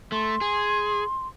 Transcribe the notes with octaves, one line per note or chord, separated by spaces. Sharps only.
A3 C6
G#4